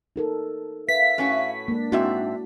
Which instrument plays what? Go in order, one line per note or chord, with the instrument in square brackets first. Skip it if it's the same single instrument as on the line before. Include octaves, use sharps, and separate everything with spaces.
[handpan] D#4 A4 A#4
[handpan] B4 [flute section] E5 F5 [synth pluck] B6
[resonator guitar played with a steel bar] A2 C#4 F#4
[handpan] G#3 A#3 [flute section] D4
[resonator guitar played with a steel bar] G#2 C4 E5 [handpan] E4 F#4